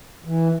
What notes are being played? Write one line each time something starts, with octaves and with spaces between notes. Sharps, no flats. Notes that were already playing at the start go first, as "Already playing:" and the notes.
E3